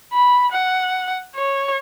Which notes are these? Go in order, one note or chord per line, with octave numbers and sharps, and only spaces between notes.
B5
F#5
C#5